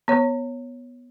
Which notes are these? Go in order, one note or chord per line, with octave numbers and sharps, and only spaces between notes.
B3 C#5